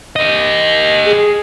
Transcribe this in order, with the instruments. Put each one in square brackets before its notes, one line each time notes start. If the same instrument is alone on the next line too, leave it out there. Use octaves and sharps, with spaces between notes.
[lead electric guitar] G4 D#5
[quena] G#4